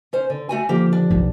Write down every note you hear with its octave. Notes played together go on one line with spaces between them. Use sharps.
C#4 C5
D3
A3 F#4 G#5
D3 F3 A#3 G4
D4
B1 F4